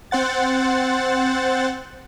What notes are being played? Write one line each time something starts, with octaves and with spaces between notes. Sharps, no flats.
C4 C5 F#5 A6